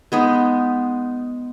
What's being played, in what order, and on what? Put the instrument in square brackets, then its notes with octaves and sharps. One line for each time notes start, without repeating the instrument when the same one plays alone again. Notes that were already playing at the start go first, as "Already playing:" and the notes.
[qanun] G#3 B3 D#4